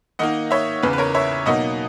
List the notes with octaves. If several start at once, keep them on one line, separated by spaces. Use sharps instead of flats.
D#3 A#3 D#4 D#5 F#5
C#5 E5
E2 C#3 E3 B4
B4
A#4 C#5
C#5 E5
B2 F#3 A#3 D#4 D#5 F#5